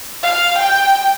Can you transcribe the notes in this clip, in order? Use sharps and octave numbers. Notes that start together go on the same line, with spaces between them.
F5
G5